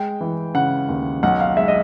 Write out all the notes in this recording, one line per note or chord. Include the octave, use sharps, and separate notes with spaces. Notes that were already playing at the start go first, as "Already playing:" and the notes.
Already playing: G#3 G5
E3
C#3 F#5
D#2
B1 F#5
F5
G#3 E5
D#5